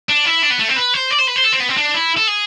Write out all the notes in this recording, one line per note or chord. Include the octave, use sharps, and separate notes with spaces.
D4
E4
D4
B3
A3
C4
B4
C5
D5
C5
B4
C5
A4
C4
B3
C4
D4
E4
A4
G#4